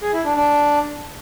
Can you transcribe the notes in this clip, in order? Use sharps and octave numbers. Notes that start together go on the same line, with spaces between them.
G#4
E4
D4
D4